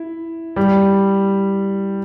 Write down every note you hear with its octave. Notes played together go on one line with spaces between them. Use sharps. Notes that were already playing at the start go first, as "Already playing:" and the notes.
Already playing: E4
G3